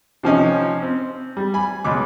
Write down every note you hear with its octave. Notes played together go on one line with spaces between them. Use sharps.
C3 F3 C#4 D#4
C4
G3
G#5 B5
C#2 B2 D6